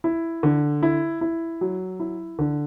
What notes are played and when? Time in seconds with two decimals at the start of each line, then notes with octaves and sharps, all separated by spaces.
0.04 E4
0.43 D3
0.83 E4
1.21 E4
1.61 F#3
2.00 E4
2.39 D3